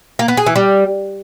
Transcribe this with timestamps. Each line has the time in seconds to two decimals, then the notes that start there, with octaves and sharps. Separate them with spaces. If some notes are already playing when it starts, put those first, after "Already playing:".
0.19 A#3
0.28 B3
0.37 G#4
0.46 E3
0.56 G3